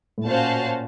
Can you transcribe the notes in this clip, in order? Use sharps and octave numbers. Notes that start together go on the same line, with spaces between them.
A2
A#2 C#4 F#4 C5 F5 A5